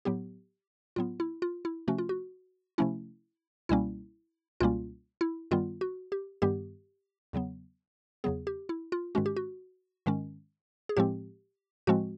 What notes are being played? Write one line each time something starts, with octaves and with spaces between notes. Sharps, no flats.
A2 F#3 B3 G4
A2 F#3 B3 F4
E4
F4
E4
C3 F3 A3 C#4 F#4
F4
F#4
C3 F3 A3 C#4 E4
C#2 B2 G3 A#3 C#4 E4
C#2 B2 G3 A#3 C#4 F4
E4
G2 D#3 G3 B3 F4
F#4
G4
G2 D#3 G3 B3 G4
E2 C#3 F#3 B3
E2 C#3 F#3 B3 G#4
G4
E4
F4
G#2 D#3 G#3 C#4 F#4
G4
F#4
G#2 D#3 G#3 C#4
G#4
A2 F3 G#3 C4 G4
A2 F3 G#3 C4 F#4